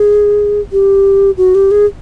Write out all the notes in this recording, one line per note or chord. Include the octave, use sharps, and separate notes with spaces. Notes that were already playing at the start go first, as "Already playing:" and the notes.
Already playing: G#4
G4
F#4
G4
G#4